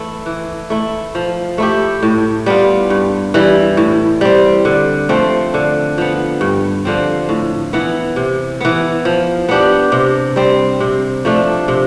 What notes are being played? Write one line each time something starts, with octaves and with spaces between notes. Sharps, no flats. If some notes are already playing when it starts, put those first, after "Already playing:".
Already playing: E3 A3 E4
E3
A3 E4
F3
A3 E4 G4
A2
G3 B3 F4
G2
E3 G3
A2
G3 C4
D3
F3 A3 C4
D3
F3 B3
G2
D3 F3 C4
A2
E3 B3
C3
E3 B3
F3
B3 D4 G4
C3
G3 C4
C3
F3 A3 D4
C3